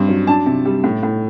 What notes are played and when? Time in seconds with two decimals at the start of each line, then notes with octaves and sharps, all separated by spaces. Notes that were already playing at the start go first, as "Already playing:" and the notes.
Already playing: G2 C4
0.09 F#3
0.27 D4 A5
0.46 C3
0.65 G3
0.84 A2
1.03 A2